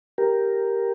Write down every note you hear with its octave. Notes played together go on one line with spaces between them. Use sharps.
G4 A#4